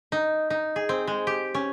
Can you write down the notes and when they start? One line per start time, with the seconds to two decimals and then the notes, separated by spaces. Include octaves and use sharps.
0.12 D#4
0.50 D#4
0.76 G#4
0.89 C4
1.07 G#3
1.27 G4
1.54 C#4